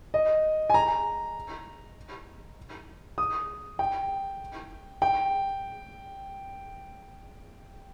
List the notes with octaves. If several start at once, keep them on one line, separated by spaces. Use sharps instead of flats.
D#5
G#5
A#5
D#6
G5
G5